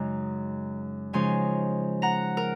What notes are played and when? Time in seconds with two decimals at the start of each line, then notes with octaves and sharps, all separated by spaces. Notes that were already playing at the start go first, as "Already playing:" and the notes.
Already playing: F#2 C#3 G#3 D#4 A#5
1.13 C#3 F3 G#3 D#4 G#5 C6
2.02 F#5 A#5
2.37 A#4